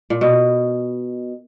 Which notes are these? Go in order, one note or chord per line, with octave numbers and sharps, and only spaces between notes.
A#2
B2